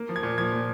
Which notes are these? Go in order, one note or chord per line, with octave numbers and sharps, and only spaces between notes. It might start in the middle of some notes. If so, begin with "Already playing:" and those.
Already playing: A#3
F3
G#6
A#2
F3 G#6
A#2